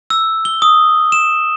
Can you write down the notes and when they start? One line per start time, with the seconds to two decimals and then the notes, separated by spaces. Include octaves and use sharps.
0.10 E6
0.45 G7
0.62 D#6
1.12 E7